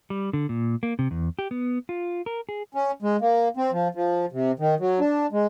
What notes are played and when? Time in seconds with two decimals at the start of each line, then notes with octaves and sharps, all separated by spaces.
0.10 G3
0.33 D3
0.49 A#2
0.83 A#3
0.99 C3
1.11 E2
1.39 G4
1.51 B3
1.89 F4
2.26 A#4
2.49 G#4
2.75 C#4
3.02 G#3
3.21 A#3
3.57 C4
3.72 F3
3.95 F3
4.32 C3
4.59 D#3
4.80 F#3
5.00 D4
5.32 G#3